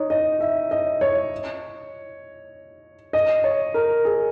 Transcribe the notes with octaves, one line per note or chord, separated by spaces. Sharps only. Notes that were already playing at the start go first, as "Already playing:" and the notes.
Already playing: D#4 C#5
D#5
E5
D#5
C#5
D#5
C#5
A#4
G#4